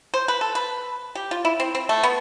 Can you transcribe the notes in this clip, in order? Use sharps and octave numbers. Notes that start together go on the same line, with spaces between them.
C5
B4
A4
B4
G4
F4
E4
C4
C4
A3
B3